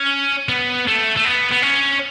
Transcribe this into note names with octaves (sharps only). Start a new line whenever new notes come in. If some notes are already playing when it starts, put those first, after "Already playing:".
Already playing: C#4
B3
A3
A3
B3
B3
C#4